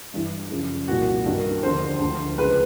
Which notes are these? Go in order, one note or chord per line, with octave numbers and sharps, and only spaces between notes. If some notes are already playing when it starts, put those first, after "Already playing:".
G2 E3
F#2 C#3 F3
C2 A#2 F3 F#4
G2 D#3
D#2 D3 F3 C5
D2 D3 F3
C#2 C#3 F3 B4